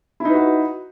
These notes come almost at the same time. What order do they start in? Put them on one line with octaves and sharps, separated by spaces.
E4 D#4 B4 F#4